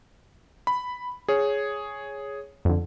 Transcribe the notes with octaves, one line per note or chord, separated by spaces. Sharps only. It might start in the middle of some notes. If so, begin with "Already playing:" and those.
B5
G#4 C#5
F2 D3